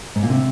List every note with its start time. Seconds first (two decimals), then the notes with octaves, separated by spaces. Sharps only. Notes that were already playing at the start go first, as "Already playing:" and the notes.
0.16 G#2
0.23 A#2
0.30 C3